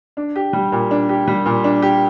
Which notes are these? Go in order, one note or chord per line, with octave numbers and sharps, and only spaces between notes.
D4
G4
G3
A#2
D4
G4
G3
A#2
D4
G4